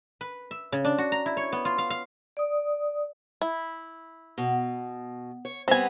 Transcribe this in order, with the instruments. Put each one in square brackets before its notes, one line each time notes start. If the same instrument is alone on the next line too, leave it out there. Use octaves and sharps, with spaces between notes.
[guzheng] B4
E5
C#3
D4
F#4
A#5
E4
C#5
B3
F4
F5
F5
[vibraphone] D5 D#6
[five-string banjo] E4
[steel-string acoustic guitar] B2
C#5
[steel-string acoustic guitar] G3 B3 [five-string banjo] C4 G#5